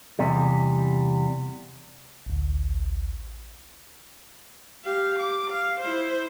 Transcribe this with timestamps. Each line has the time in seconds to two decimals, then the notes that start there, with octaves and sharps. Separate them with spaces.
0.19 E2 C3 G3
2.26 A1 D2
4.84 G4 F5
5.19 D6
5.51 F5
5.80 E4 C5